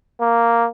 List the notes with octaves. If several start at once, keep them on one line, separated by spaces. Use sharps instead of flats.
A#3